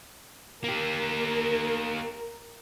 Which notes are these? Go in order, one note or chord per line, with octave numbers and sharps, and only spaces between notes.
A#3 G4 A#4